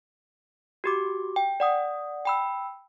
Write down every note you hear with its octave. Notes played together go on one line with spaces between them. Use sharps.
F#4 G4 D6
G5
D5 F#5 D#6
G5 B5 E6